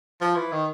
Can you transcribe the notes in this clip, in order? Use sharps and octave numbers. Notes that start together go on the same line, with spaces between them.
F3
E3
D#3